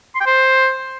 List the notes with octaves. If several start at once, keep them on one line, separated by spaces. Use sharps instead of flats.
C6
G5
C5